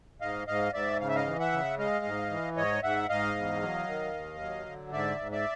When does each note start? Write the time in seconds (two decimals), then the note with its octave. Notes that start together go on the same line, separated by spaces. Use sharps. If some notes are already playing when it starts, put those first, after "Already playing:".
0.21 G#2 D#5 F5
0.47 G#2 D#5 F5
0.73 G#2 D5 E5
1.00 C#3 F5
1.08 E5
1.15 D#5 F5
1.26 E3
1.40 E5 F#5
1.52 C#3
1.78 G#3 D#5 F5
2.05 G#2
2.31 E3
2.57 G#2 C#5 D#5
2.83 G#2 E5 F#5
3.09 G#2 D#5 F5
3.36 E2
3.62 F#3
3.88 D#3
4.14 D#2
4.40 F#3
4.66 D3
4.92 G#2 D5 E5
5.19 G#2
5.32 D5 E5